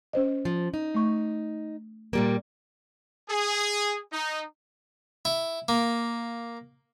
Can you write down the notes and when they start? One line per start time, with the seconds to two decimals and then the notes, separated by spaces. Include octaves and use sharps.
0.13 C#4 C5 D#5
0.45 F3
0.74 D#4
0.95 A3 C#6
2.13 A#2 G3 A#3
3.29 G#4
4.12 D#4
5.25 E4
5.68 A#3